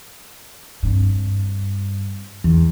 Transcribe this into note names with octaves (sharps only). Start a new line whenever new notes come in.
G2 C4
E2